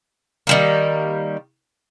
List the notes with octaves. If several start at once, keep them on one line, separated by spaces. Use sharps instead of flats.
D#3 G3 A#3